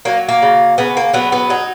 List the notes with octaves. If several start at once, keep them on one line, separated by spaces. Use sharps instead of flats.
F#3 A#3
A#3
C#3
C#3 B3
A#3
F#3 B3
B3
F#3 D#4